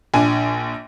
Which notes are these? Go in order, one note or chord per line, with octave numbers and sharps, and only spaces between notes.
A#1 D4 G#5